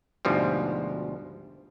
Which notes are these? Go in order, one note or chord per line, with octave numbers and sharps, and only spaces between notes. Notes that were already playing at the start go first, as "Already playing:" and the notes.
D2 G#2 B2 F3 G3